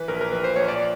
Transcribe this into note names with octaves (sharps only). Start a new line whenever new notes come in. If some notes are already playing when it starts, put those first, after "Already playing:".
Already playing: E3 B4
A#1 A#4
A#4
A#1 B4
C5
A#1 C#5
D5